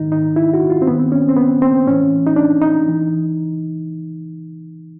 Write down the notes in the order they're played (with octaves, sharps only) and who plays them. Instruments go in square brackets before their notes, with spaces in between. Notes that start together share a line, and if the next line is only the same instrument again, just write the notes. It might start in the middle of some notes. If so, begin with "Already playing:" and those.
Already playing: [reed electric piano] G#2 D#3 D#4
D#4
E4
F#4
F4
C4
G2 D#3 B3
C4
C#4
C4
B3
C4
A2 E3 C#4
D#4
D4
D#4
E3